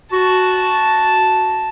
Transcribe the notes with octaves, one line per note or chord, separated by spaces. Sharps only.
F#4 A5